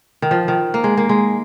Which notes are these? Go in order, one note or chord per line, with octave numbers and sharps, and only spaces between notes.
D#3
F3
D#3
A#3
G#3
A#3
G#3